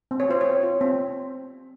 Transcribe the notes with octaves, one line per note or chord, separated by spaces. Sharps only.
C4
C#5
F4 C5
C4 C#5
F4
C4